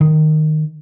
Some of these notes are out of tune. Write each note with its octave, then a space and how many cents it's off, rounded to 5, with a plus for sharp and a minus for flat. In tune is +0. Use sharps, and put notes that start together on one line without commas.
D#3 -10